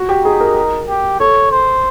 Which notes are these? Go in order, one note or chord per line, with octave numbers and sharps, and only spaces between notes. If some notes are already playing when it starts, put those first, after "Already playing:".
Already playing: F#4
G4
D#4 G#4
A#4
G4
A4 C#5
C5